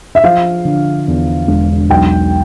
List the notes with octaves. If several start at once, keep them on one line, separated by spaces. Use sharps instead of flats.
E5
F3 F5
D3
E2
E1
B1 G5